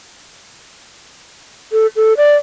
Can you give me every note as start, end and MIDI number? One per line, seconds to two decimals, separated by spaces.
1.72 1.87 69
1.96 2.13 69
2.17 2.36 74